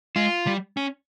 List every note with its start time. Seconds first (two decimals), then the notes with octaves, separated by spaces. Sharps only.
0.16 G#3 F4
0.47 G3
0.77 C#4